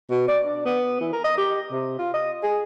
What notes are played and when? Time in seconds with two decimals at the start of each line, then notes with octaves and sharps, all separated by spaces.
0.11 B2
0.28 D5
0.45 D4
0.65 B3
1.00 E3
1.12 A#4
1.24 D#5
1.37 G4
1.72 C3
1.99 F4
2.14 D#5
2.43 G#4